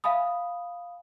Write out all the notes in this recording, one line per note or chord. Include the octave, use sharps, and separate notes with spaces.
E5 F5 G#5 B5 D#6